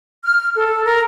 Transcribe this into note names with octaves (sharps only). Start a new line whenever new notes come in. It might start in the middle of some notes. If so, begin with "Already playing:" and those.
F6
A4
A#4